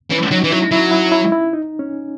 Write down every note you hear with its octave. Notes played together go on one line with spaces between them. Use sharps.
E3 C#4
F#3 D#4
E3
F#3 E4
F#3 E4
E4
E4
E4
D#4
C#4